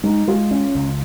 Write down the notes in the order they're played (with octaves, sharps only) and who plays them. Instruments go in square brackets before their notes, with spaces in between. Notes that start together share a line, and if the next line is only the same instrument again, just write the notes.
[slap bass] G#3 [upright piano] D#4
[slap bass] G#3 [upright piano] F4
[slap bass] C#4
C#2